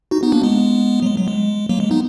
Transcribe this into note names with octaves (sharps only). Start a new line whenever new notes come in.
D#4 F#4
B3 D#4
A#3 D4
G#3 B3
F#3
G#3
F#3
G#3
F#3 A#3
G#3
B3 D#4